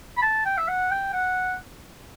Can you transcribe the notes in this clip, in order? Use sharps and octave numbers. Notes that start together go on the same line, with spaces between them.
B5
A5
G5
E5
F#5
G5
F#5